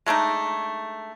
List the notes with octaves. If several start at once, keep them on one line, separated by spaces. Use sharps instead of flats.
G#3 A3 D4 D#4